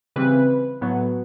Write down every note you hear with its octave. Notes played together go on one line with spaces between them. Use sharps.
C#3 E3 G3 C4 B4
A2 F#3 B3